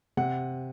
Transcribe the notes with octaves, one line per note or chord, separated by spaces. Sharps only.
C3 F#5